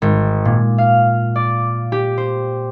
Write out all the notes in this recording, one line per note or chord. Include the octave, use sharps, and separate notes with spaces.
G#1
A#2
F5
D5
G4
C5